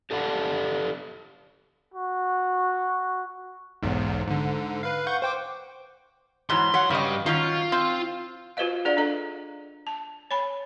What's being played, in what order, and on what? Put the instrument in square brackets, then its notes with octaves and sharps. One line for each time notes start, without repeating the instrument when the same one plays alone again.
[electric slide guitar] G4 A4 D5 F5 F#5
[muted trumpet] F#4
[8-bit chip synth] B1 E2 G#2
G#2 D3
B4 F5
F#5 C#6 G6
C5 G5 D6
[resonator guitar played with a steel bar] G#2 E3 F#3 [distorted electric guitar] C6
[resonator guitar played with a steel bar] F#3 F#5
[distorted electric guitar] G2 G3 [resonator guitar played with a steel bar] C#3 D#5
[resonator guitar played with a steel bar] D#3 F#3 C#4 [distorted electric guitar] F4
[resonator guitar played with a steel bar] C4
[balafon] F4 F#4 B4 C5 D#5 F5
D4 G#4 B4 D5 F5 F#5
D4 A4 D#5 A#5
A5
C#5 G#5 B5